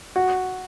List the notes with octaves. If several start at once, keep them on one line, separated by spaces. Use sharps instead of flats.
F#4